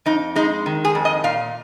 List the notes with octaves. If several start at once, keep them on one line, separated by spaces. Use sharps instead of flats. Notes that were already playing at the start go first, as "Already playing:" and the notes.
F2 D#4
G#3 D#4
D#3
G#4
F2
D#5
A#2 F5